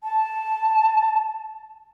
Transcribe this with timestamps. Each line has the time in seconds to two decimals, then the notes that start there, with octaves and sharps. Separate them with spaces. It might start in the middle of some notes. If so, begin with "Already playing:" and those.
0.04 A5